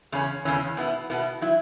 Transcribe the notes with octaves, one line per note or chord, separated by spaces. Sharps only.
E2 C#3 C#4
E2 C#3 E3 C#4
B2 B3 E4
B2 B3 E4
F#3 E4